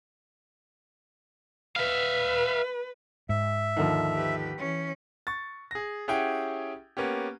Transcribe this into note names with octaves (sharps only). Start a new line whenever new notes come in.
B4 E5 F5
G#2 E5
D#2 D3 F3
G4 B4
E3 C#4
C#6 A6
G#4 A#6
C#4 E4 G4 G#4 F#5 G5
A#3 B3 C#4 G4